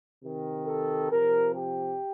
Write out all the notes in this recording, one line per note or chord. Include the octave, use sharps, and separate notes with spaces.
C3 D#3
A4
C3 F3 A#4
G4